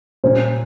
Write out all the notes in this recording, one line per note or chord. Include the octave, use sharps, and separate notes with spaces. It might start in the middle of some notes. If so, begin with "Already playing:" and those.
A#2 G3 A#3 C#4 C5